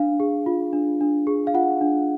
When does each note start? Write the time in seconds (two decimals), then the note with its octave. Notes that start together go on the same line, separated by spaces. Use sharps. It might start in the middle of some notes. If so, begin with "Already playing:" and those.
Already playing: D4 F5
0.20 G#4
0.46 F4
0.73 D4
1.01 D4
1.27 G#4
1.47 F5
1.54 F4 F#5
1.81 D4